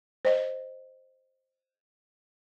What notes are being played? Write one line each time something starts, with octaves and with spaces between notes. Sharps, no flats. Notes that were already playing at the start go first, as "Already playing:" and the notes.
C5 D#5